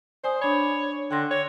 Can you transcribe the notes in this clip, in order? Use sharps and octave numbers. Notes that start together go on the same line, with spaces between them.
C5 D5 G#5 D#6
D4 C#5 B5
D3 G5 C6 A#6
C#5